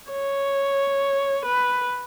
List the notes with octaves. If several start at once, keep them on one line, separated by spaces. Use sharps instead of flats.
C#5
B4